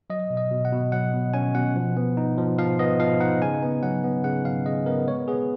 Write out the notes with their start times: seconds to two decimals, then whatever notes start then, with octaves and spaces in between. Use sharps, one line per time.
0.10 F#3 D#5
0.30 B2
0.37 D#5
0.51 B2
0.65 F#5
0.72 B2
0.92 F#3 F#5
1.14 B2
1.34 C#4 G#5
1.55 B2 F#5
1.76 F3
1.97 B3
2.17 D#4
2.37 F3
2.58 F3 F5
2.79 B3 D#5
3.00 F3 F5
3.20 D#4 F#5
3.42 C#3 G#5
3.62 B3
3.83 F#3 F#5
4.04 B3
4.24 C#3 F#5
4.45 F#3 F5
4.66 C#3 D#5
4.86 B3 A#4
5.07 G#3 C#5
5.28 B3 G#4